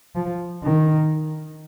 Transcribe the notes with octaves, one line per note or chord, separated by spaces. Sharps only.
F3
D#3